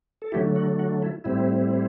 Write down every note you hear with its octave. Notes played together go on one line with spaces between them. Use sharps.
A4
D3 F#3 A3 E4 G4
F#4
F#4
E4
A2 G3 C4 E4